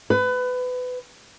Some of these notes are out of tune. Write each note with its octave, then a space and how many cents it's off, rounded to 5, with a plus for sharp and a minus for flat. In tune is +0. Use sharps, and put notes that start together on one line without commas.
B4 +25